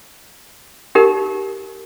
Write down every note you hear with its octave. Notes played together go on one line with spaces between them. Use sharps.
D#4 G4 A#4